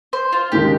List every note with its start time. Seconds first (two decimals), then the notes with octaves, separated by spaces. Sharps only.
0.13 C5
0.32 F4
0.52 D#2 C#3 G#3 D#4 G4 A#4